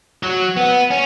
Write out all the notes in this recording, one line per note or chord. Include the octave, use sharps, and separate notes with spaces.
F#3
B3
C#4